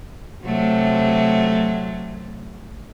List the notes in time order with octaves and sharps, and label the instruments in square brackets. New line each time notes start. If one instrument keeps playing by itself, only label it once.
[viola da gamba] C3 F#3 A3